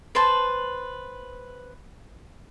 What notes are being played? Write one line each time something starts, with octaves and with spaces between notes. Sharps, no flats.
B4 C5 A5